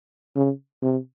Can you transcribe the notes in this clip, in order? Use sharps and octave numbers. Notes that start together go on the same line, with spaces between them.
C#3
C3